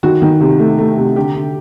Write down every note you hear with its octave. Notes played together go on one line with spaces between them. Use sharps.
D#3 F#4
D#3
C3
A3
A3
C3
D3 G4
D3